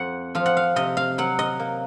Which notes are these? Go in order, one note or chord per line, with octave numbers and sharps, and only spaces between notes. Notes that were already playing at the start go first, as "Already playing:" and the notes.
Already playing: F2 F#5
F3 F5
F#5
F5
C3 D#5
F5
F#3 F#5
D#5
A#3